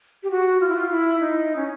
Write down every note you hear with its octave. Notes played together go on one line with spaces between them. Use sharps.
G4
F#4
F4
E4
F4
E4
D#4
C#4